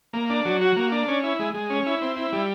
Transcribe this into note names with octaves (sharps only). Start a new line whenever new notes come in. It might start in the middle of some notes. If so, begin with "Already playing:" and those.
A#3
D4
F#3
F#4
A#3
D4
C#4
E4
G#3
G#3
C#4
E4
C4
E4
G3